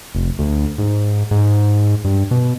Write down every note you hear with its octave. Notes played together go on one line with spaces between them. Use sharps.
F1
D2
G#2
G#2
G2
B2